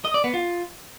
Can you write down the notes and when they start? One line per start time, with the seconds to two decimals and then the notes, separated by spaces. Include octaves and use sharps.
0.05 D#5
0.14 D5
0.24 B3
0.34 F4